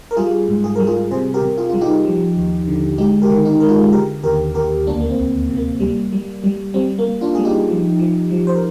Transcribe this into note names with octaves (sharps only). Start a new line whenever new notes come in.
A#4
G3 F4 G#4
G#2
G#4
G3 A#4
F4 G#4
C3 G#4 C5
G4 A#4
C3
F4 G#4
G3 F4
D#4 G4
F3
D#2
D3
G#3 D#4 G4
G4 A#4
D#3
D#4 G4
G#3 A#4
F4 G#4
D3 G4 A#4
D#2 G4 A#4
D#2 G4 A#4
D2 A#3 D4
A#3
C4
D2
C3
A#3
G3
G3
G3
G3 C4
A#3
G3
D4 F4
G3 G#4
D#4 G4
F3
F3
F3
C5
A#4